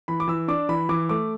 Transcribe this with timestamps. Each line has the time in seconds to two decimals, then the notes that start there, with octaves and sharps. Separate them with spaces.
0.08 E3 B5
0.20 D6
0.28 E3 E6
0.48 D4 D6
0.69 E3 B5
0.89 E3 D6
1.09 A3 D6